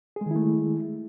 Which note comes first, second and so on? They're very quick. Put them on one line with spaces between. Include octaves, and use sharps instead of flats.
G#4 G#3 D#3 E4 A3